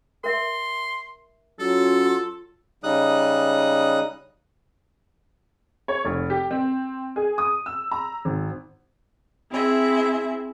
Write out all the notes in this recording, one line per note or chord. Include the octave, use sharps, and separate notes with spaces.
A#4 E5 C6
F#3 C#4 F4 A4
C#3 G3 D#4 D#6 F#6
C#5
F1
G4
C4
G#4
D#6
E6
A#5
G#1
C4 E4 G#4 E5